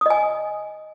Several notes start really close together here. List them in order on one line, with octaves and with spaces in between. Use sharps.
D#6 D#5 G#5